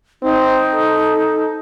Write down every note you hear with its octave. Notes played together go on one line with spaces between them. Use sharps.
C4 D#4
A4